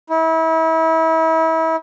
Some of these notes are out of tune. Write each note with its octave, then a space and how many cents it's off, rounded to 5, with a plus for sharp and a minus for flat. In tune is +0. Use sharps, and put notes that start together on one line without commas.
E4 -35